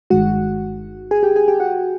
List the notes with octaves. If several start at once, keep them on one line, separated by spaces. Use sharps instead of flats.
G1 G2 D#3 G#3 F#4 F#5
G#4 G#5
G4 G5
G#4 G#5
G4 G5
F#4 F#5